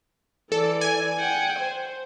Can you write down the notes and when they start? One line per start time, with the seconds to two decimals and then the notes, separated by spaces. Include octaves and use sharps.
0.52 E3 A4 D5
0.81 G#5
1.19 F#5 G5
1.59 C5